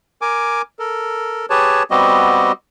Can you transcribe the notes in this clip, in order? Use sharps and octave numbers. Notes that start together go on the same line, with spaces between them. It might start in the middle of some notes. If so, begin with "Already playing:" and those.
A#4 G#5 D6
A4 A#4
G4 G#4 B4 C#5 A5
G3 B3 C4 F#4 G4 D#5